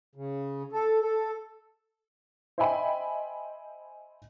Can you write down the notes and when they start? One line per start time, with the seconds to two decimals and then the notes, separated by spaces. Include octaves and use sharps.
0.15 C#3
0.73 A4
1.01 A4
2.58 C5 D#5 E5 G5 G#5 B5